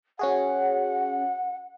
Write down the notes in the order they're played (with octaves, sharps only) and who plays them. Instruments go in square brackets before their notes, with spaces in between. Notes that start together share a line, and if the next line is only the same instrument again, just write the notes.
[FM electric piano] C#4 F#4 G#4 [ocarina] F#5